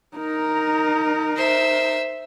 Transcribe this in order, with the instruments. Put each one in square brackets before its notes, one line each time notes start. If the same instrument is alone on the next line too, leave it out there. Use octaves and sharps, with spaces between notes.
[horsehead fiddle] D#4 A#4
[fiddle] C5 E5